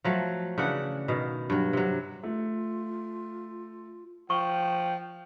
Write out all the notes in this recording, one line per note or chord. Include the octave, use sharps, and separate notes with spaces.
F3 F#3 A3
C#3 E3 D4 F#5
B2 D#3
G2 F#3
C3 F#3
A3 F4
F3 G5 C#6